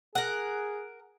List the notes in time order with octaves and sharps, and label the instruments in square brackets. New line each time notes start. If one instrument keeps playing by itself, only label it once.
[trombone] G#4 [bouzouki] A#4 F#5